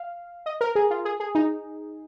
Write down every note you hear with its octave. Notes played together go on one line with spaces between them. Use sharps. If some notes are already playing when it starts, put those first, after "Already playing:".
Already playing: F5
D#5
A#4
G#4
F4
G#4
G#4
D#4